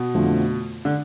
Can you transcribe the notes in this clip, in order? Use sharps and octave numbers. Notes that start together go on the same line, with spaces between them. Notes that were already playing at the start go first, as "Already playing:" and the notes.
Already playing: B2
F2 D3 F3 A3
D3